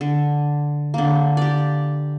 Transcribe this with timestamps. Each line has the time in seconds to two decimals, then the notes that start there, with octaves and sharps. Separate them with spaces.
0.01 D3
0.94 D3 A#3
1.37 G4 D5